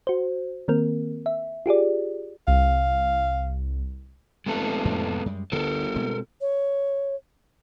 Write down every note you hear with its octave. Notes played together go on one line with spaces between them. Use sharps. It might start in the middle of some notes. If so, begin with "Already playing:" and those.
F#4 C5
D#3 A#3 C4 A#4
E5
F4 G4 G#4 D5
C2 F5
F1 G#3 B3 A4
F2 A2 C3
F#2 G3 G#3
G1 D2 D3 G3 A4 A#4
B2 G#3 C4
C#5